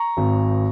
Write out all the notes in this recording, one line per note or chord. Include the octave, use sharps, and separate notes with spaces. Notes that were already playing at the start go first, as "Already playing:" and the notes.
Already playing: A#5 C#6
G#1